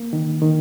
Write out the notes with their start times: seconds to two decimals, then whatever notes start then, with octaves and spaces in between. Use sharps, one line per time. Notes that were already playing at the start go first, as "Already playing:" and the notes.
Already playing: A#3
0.13 D#3
0.42 D#3